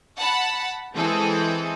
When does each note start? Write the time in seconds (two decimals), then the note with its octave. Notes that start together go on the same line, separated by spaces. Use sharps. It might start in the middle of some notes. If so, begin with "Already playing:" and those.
0.18 F#5 A5 B5
0.95 E3 G#3 C4 G#4 A4